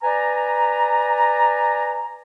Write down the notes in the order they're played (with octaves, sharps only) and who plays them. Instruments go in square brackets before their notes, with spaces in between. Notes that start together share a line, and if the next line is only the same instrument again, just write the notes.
[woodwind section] B4 D5 G#5 A#5